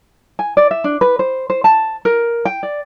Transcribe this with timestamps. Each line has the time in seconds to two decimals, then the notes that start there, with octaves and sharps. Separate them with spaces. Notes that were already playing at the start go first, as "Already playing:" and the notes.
0.39 G#5
0.57 D5
0.71 E5
0.84 D4
1.01 B4
1.19 C5
1.50 C5
1.64 A5
2.05 A#4
2.45 G5
2.63 D5